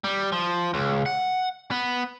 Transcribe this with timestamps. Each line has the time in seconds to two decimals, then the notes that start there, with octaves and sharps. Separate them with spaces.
0.04 G3
0.32 F3
0.74 C#2
1.06 F#5
1.71 B3